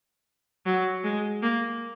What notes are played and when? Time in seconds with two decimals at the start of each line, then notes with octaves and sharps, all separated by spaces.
0.66 F#3
1.04 G#3
1.42 A#3